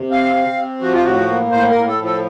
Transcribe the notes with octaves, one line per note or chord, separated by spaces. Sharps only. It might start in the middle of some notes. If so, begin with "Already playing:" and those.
Already playing: C3
C4 F5
C4
C3
F3 F#4
F4
A2 F#4
A#3
A2 C5
A#4
A2
A4
F3
A4